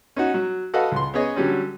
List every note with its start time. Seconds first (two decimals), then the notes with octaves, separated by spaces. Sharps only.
0.16 C#4 D#4 F#4
0.34 F#3
0.74 F#4 A4 B4 D#5 F5 F#5
0.92 C#2 C6
1.14 B3 C#4 G#4 C#5 D#5
1.36 D3 F#3 G3 C#4